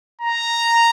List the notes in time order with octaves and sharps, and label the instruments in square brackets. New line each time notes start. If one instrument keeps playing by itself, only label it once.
[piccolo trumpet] A#5